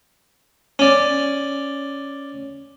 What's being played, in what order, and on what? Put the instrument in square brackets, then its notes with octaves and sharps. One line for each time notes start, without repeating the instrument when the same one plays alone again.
[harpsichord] C#4 D5